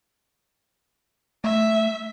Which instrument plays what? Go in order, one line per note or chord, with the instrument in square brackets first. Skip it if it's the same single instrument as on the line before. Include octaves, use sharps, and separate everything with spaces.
[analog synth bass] A3 [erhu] E5